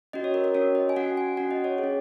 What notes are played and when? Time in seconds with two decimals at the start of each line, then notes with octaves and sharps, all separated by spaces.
0.13 C#4 F#4 D#5
0.24 C#5
0.34 A#4
0.44 A#4
0.54 C#4 F#4 C#5
0.75 D#5
0.89 G#5
0.96 C#4 F#4 F#5
1.17 G#5
1.37 C#4 F#4 F#5
1.51 D#5
1.64 C#5
1.78 G#4
1.84 C#4